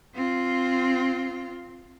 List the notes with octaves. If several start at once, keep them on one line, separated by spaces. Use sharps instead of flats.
C4 F4